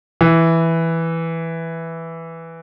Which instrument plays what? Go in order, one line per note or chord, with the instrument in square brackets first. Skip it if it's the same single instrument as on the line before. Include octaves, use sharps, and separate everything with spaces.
[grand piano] E3